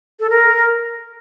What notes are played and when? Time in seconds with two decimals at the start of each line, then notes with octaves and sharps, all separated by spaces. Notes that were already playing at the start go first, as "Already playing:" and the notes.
0.20 A4
0.30 A#4